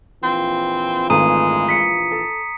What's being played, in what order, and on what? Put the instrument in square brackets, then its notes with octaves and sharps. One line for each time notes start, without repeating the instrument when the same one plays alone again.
[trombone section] A#1 E3 F4 [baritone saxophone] C4
[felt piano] G#1 A3 B4 [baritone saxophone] G#3 [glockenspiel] A#5 D#6 D#7
[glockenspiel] B6 C#7
[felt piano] A4